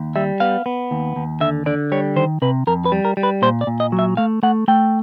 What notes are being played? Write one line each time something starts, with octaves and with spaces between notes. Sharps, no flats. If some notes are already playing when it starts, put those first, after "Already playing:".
Already playing: D#2
G3 E5
B3 F5
B3
D#2
D#2
D3 E5
D3 D5
G3 C#5
D#3 C5
C3 B4
F2 A#4
B4
G3
A#4
G3
B4
A#2 C5
D5
A#2
D#5
F#3
E5
A3 F5
A3 F#5
A3 G5